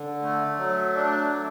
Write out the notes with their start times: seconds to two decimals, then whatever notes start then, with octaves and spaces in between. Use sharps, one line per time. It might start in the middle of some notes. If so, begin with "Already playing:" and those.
Already playing: D3
0.22 A3
0.58 F#3
0.95 D4
1.30 A3